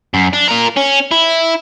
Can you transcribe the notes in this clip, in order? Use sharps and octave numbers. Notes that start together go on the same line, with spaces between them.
F#2
D4
F4 A#4
C#4
E4